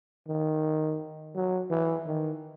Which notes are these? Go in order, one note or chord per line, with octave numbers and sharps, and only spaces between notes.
D#3
F#3
E3
D#3